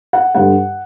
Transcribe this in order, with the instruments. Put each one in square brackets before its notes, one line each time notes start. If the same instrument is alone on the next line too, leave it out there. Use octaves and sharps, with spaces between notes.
[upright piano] F#5
G2 D3 F#5